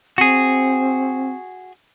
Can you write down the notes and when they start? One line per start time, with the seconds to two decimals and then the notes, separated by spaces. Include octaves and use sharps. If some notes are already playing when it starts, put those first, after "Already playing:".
0.18 C4 F#4 G#4